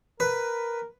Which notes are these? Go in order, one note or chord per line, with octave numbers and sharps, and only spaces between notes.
A#4 B4